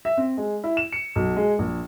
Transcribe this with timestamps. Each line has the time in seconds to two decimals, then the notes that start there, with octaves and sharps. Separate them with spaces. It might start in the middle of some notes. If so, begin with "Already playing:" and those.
0.05 E5
0.17 C4
0.37 G#3
0.64 E4
0.77 E7
0.92 C#7
1.16 B1
1.36 G#3
1.59 A#1